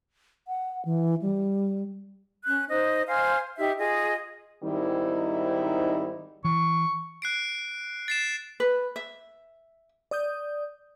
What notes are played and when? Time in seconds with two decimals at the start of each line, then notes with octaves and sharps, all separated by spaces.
0.48 F#5
0.85 E3
1.22 G3
2.46 C#4 F#6
2.69 D#4 C5 D#5
3.07 C5 F5 G#5 F6
3.58 D#4 G4 E5
3.77 F4 G#4 D#5
4.63 G#2 D#3 G3 C4 D#4 E4
6.45 E3 C#6
7.22 F#6 C7 D7
8.08 A6 C7 E7
8.60 B4
8.96 E5
10.11 D5 D#6 G6